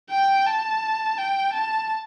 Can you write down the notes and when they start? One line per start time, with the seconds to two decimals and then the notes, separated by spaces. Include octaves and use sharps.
0.10 G5
0.46 A5
1.18 G5
1.53 A5